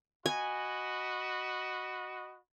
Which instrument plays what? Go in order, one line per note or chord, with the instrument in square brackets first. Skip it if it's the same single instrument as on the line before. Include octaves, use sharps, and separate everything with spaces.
[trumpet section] F#4 D#5 B5 [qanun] G#5